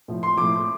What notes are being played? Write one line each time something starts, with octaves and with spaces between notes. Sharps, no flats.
A2 F3
C6
A2 F3 D6